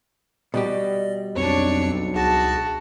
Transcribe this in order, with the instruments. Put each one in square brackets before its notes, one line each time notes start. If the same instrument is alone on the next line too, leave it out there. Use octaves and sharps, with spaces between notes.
[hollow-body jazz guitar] B2 G3 G4 [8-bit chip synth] D5 D#5
[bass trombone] B1 [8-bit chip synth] F2 C4 C#7 [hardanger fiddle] D4 C#5
[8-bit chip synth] C#2 G#4 A#6 [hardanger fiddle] F#4 A5